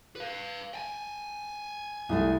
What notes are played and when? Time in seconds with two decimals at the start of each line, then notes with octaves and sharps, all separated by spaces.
0.16 B4 F5
0.74 G5 G#5
2.09 C2 G#3 A3